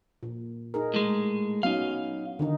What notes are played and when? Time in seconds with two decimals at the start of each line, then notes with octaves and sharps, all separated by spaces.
0.23 A#2
0.74 D#4 G#4 A#4
0.94 A2 G#3
1.63 F#3 B3 C#4 D#4 F5
2.39 D3 D#3 D#4